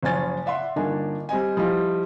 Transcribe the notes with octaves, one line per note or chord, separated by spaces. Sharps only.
F#1 F3 C#4 G#5 A6
D5 E5 F#5 C6
G1 A#3 D4 D#4 G#5
G3 C4 D#5 G#5
F3 G3 E4 D#5